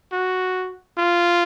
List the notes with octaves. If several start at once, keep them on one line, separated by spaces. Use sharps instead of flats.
F#4
F4